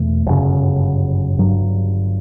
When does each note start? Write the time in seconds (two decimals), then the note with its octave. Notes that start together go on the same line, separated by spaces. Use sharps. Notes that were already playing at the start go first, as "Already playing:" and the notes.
Already playing: E2 B2 A3
0.26 G1 F#2 C#3
1.38 G1 G2 F#3